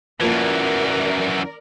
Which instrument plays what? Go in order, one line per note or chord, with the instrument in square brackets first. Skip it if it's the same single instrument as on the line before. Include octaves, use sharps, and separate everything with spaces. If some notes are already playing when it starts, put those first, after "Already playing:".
[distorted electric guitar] F#2 E3 [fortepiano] F3 A#3 [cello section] A#4 D5